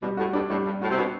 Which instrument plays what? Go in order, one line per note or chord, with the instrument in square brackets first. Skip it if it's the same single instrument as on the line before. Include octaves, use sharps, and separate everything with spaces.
[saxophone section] B2 [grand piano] G3
[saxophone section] A2 [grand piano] F#4
[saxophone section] G2 [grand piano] D4
[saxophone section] A2 [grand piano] G3
[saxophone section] G2 [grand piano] G3
[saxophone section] A2 [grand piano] F#4
[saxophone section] C3
[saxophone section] B2 [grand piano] D4